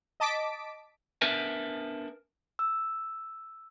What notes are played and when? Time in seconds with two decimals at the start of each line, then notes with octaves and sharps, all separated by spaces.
0.20 D#5 A5 D6 B6 D7
1.22 B3 D4 A#4 B4 E5 G#5
2.59 E6